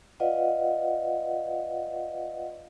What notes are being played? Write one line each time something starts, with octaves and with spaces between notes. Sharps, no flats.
F4 B4 D5 D#5 F5 F#5